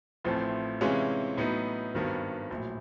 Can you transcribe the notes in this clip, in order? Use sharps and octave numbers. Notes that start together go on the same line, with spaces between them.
A1 A2 F3 A3 C4
C3 E3 G#3 C#4 F4
A2 F#3 B3 D#4
G#1 G2 D#3 F#3 B3
A#1 A2 F#3